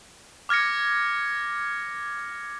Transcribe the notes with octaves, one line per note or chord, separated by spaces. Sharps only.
D6 F6 G#6 A#6 C#7